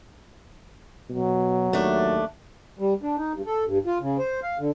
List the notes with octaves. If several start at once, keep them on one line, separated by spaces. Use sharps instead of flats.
B2 F#3
D#2 A3 D4
G3
D4
D#4
G2
A4
G2
F4
C#3
C5
F5
D3